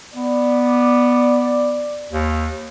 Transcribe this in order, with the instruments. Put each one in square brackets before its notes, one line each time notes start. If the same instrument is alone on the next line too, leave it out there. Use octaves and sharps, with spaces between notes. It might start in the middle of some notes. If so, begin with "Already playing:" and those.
[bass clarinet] B3 [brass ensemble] D5
[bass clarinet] D#2